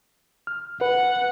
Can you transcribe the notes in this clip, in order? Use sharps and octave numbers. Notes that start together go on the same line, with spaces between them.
F6
B4 F#5